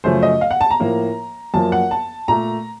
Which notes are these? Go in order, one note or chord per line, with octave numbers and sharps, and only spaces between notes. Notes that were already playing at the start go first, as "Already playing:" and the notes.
F#2 C#3 F3 A3 C5
D#5
F5
F#5
A5
A#5
A2 F3 A#3
F#2 F3 A#3 A5
F#5
A5
A#2 A3 A#5